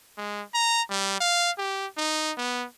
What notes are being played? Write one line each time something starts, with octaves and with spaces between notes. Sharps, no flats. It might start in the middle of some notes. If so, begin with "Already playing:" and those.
G#3
A#5
G3
F5
G4
D#4
B3